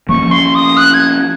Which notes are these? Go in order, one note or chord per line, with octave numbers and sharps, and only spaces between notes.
F3 A#3 C#4 C#6
C6
D#6
F#6
G#6